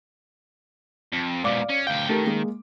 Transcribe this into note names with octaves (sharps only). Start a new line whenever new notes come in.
F2
G#2 B2 D5 F5 D6
C#4
D2 F5 G5
D#3 A3 G4 A#4
G#3 A#3